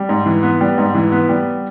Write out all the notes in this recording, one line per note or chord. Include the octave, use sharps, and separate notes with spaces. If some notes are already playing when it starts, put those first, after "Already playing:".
Already playing: G3
G#2
E3
B3
G3
G#2
E3
B3
G3